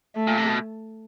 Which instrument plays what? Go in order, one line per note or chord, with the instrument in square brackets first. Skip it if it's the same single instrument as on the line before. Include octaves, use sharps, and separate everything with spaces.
[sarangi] A3
[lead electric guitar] A#2
C3
B2